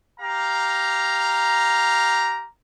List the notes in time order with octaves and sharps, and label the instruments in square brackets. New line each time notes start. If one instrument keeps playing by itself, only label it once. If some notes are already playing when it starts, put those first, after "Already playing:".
[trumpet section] G4 F5 A#5